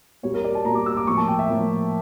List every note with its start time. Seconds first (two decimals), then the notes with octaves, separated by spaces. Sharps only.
0.23 A#2 G3 A#3 C#5
0.34 A#4
0.44 D5
0.55 A5
0.65 A#2 G3 A#3 A#5
0.75 D6
0.86 E6
0.97 D6
1.07 A2 F3 A#3 C#6
1.17 A5
1.28 G5
1.39 E5
1.49 A2 F3 A#3